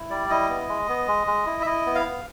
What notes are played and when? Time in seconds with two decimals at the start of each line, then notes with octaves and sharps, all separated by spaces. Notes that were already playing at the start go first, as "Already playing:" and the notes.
Already playing: E4
0.10 G3 D5
0.30 E4 D#5
0.49 B3
0.69 G#3
0.89 B3
1.08 G#3
1.27 G#3
1.46 E4
1.62 E5
1.66 E4 D#5
1.86 B3
1.95 F5
2.05 B3